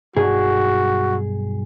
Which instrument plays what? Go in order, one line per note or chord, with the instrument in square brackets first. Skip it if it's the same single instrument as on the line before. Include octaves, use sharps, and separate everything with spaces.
[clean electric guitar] B1 G2 G#4 [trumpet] F#4